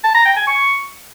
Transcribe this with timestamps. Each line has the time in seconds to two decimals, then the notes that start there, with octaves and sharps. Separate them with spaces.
0.04 A5
0.15 A#5
0.25 G5
0.36 G#5
0.47 C#6